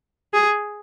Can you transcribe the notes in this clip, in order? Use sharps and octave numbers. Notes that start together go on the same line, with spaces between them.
G#4